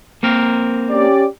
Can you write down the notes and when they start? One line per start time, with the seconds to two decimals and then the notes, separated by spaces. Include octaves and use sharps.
0.23 A#3 C4 A#4
0.90 C#4 G4 D5